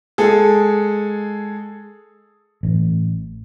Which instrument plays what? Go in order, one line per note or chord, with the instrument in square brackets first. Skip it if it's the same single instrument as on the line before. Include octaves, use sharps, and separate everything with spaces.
[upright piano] G#3 G#4 A4
[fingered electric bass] A1